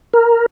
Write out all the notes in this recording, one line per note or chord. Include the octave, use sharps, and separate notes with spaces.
A#4